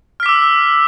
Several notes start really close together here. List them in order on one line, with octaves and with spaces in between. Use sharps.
F6 B6 D6 E6